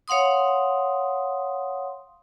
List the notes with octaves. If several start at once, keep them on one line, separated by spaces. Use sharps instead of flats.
C#5 F5 F#5 C6 D#6